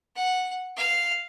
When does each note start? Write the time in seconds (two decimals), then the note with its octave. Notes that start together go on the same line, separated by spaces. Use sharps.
0.16 F#5
0.77 F5